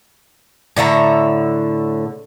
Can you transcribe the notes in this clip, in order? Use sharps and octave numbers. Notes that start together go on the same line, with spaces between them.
A2 D3 E5 A#5